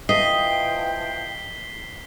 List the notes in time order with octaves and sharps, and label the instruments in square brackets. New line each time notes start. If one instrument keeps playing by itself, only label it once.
[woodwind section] E3 F3 G5 [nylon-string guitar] D#5 [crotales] B6 C7 G7